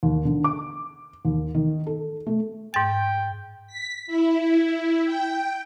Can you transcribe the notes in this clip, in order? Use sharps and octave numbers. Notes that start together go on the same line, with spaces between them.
D#2
D3
D6
D#2
D#3
A4
A3
G#2 G5 A6
B6
E4
G5